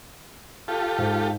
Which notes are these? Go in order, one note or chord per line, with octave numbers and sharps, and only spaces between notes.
F4 G4 A4
G#2